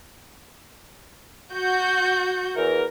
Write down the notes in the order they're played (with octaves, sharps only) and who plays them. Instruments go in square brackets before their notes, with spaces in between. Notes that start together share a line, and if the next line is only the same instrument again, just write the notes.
[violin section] F#4 G6
[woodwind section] E2 E3 A#4